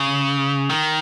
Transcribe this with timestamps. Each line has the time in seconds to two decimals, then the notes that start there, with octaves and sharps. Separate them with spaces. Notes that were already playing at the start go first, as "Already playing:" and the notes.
Already playing: C#3
0.70 D#3